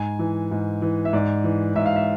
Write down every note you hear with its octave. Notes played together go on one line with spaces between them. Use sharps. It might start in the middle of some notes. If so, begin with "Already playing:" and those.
Already playing: G#2 G#5
E3
G#2
E3
E5
G#2 D5
E3
G#2 E5
F5
E5